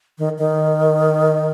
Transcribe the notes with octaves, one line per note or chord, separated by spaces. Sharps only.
D#3
D#3